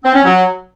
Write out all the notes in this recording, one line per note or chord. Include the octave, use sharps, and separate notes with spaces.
C4
C#4
F#3